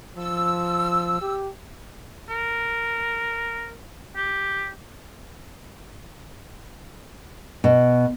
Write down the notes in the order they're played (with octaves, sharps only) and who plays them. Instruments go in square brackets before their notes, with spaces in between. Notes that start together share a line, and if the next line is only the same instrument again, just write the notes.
[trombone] F3 [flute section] E6
[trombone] G4
[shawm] A#4
G4
[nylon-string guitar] B2